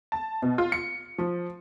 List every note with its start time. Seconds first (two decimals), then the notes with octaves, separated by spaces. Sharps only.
0.12 A5
0.42 B2
0.58 F4
0.72 C#7
1.18 F3